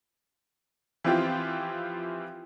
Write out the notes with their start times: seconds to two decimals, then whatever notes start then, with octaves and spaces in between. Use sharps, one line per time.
1.04 E3 F3 C4 E4 F4 G4